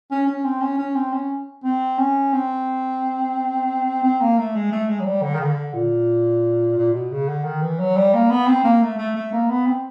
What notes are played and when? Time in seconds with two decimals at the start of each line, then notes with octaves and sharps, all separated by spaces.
0.11 C#4
0.27 C#4
0.44 C4
0.61 C#4
0.78 C#4
0.95 C4
1.13 C#4
1.64 C4
1.98 C#4
2.33 C4
4.03 C4
4.21 A#3
4.37 A3
4.55 G#3
4.72 A3
4.88 G#3
5.00 F#3
5.05 G3
5.22 D3
5.34 D#3
5.40 D3
5.73 A#2
6.77 A#2
6.93 B2
7.11 C#3
7.28 D3
7.44 D#3
7.62 E3
7.79 F#3
7.96 G3
8.13 A#3
8.30 B3
8.47 C4
8.64 A#3
8.82 A3
8.98 A3
9.15 A3
9.32 A#3
9.49 B3
9.66 C4